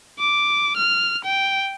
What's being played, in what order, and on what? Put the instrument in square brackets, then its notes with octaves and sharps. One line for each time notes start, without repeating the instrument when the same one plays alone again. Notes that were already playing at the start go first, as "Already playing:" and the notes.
[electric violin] D6
F6
G5